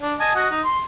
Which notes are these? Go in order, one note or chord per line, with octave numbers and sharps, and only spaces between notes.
D4
D#5 G#5 A5
F#4 D#5 F#5
D#4
C6